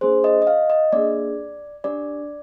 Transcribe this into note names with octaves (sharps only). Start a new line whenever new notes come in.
A#3 D4 G#4 C5
D#5
D#5
F5
D#5
A#3 D4 G#4 D5
D4 G4 D5